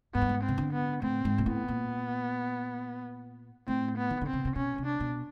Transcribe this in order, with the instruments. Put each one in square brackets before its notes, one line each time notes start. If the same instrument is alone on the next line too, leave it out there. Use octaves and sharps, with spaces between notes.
[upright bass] G#2 [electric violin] B3
[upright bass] G2
G#2
[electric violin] C4
[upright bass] C#3
D3
[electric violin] B3
[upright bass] A2 [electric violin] C4
[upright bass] G#2
A#2
[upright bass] A2 [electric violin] B3
[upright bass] A#2
[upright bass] A2 [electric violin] C4
[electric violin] B3
[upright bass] D#3
D3
[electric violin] C4
[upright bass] C#3
C3
[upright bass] B2 [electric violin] C#4
[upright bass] C3
[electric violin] D4
[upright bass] B2